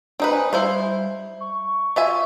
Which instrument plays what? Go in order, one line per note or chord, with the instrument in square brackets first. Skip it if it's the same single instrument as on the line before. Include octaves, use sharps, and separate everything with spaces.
[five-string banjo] C4 D#4 B4 [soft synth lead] D4
[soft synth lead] G#5
[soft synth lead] G3 [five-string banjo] E4 C5 F5
[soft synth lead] C#6
[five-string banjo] F4 E5 G#5